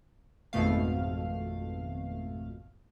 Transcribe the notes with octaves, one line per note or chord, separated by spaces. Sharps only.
G#1 F2 B2 A3 F5